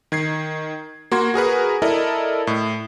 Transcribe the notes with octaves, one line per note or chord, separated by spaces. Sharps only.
D#3 G#6 C7
A#3 F#4 C6 G#6
F#4 G#4 A#4 B4
E4 A4 A#4 D5 D#5
A2